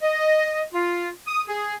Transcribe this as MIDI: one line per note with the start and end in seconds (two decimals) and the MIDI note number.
0.02 0.62 75
0.74 1.08 65
1.26 1.42 87
1.47 1.75 68